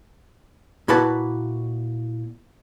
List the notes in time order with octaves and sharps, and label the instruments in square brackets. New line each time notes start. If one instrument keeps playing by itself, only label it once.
[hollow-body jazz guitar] A#2 E4 F#4 B4 A5